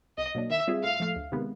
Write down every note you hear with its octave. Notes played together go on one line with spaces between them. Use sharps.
C2 D#5
B2 F#3 A#3 D4
D#3 E5
G3 C4 F4 G#4
A2 F5
F3 A3
D2
C3 D#3 G#3 B3